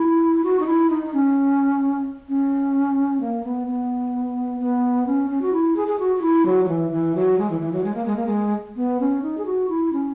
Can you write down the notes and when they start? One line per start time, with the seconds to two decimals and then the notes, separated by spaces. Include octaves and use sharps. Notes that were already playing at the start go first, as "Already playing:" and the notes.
Already playing: E4
0.44 F#4
0.60 D#4
0.66 E4
0.90 D#4
1.06 D#4
1.14 C#4
2.29 C#4
3.21 A#3
3.44 B3
3.67 B3
4.60 B3
5.07 C#4
5.30 C#4
5.42 F#4
5.53 E4
5.76 G#4
5.88 G#4
6.00 F#4
6.17 F#4
6.22 E4
6.46 F#3
6.65 F#3
6.68 E3
6.91 E3
7.15 F#3
7.38 G#3
7.50 E3
7.61 E3
7.73 F#3
7.84 G#3
7.94 A#3
8.05 G#3
8.16 A#3
8.26 G#3
8.76 B3
9.00 C#4
9.23 D#4
9.38 G#4
9.46 F#4
9.69 E4
9.93 C#4